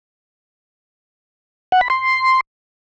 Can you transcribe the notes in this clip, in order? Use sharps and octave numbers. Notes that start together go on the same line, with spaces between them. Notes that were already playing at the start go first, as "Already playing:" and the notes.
F#5
B5
C6